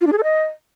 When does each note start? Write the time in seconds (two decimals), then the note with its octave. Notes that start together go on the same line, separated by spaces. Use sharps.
0.01 F4
0.07 D4
0.12 G#4
0.18 A4
0.24 D#5